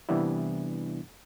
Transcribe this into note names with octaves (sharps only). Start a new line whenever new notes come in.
C3 E3 G3 B3 D4 E4